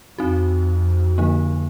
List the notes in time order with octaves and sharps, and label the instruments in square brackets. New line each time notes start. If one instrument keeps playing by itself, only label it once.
[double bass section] F2 [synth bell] C4 D#4 F#4
[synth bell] D3 F3 A#3 D#4